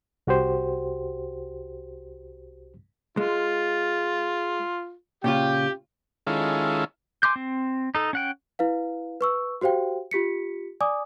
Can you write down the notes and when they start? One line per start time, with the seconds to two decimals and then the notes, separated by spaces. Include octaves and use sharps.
0.27 C2 F#4 G4 C5
3.17 G#3 F4
5.24 A#2 C#3 F4 G4 G5
6.27 D#3 G#3 C#4 E4 F4 A4
7.23 G#5 C6 D6 G6
7.36 C4
7.95 D#4 A4
8.13 C#4 F#5 G5
8.59 E4 B4 F5
9.21 B4 C#6 E6
9.61 F#4 G4 C5 F5 G5
10.11 F4 G4 B6 C#7
10.81 D5 G#5 D6 D#6